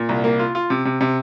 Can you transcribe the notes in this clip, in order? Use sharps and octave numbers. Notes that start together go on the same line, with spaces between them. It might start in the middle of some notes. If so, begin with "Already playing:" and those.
Already playing: A#2
C2
A#3
F4
F4
C3
C3
C3